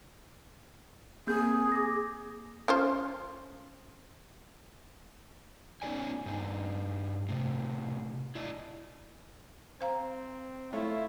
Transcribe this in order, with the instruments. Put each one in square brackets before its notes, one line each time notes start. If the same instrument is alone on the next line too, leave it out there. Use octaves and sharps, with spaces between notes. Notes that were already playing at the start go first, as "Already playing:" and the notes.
[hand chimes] A#3 C4 G6 [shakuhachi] G#4
[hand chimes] D6 A#6
[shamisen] C#4 F4 C5
[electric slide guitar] B3 C#4 D#4 G#4 D5 G#5
G2 D#4
A2 C3
E4 D5 D#5
[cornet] C4 [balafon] C5 F5 A#5
[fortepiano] A3 C#5 [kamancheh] E4 [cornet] F4